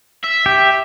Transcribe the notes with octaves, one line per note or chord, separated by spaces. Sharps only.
E5
G4